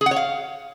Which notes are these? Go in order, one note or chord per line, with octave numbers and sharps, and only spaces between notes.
G#4
F#5
C#5
F5